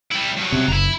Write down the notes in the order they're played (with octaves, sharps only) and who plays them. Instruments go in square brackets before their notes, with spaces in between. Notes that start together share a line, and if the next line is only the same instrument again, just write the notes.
[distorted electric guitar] G3 E4
G2 F#3
[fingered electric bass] C3
[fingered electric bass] F#1 [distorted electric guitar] E4 A#5